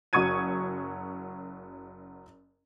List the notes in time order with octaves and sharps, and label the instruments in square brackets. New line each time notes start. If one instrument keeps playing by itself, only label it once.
[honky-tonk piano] F#1 F#3 C#6 D#6 G#6 D#7